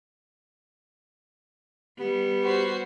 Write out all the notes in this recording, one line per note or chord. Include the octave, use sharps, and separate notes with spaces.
G3 B3 G4
F#4 C5